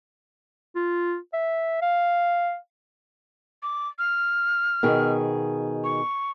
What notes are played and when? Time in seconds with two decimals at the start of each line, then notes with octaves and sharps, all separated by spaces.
0.76 F4
1.34 E5
1.82 F5
3.63 D6
3.99 F6
4.83 B2 D#3 G#4
5.84 C#6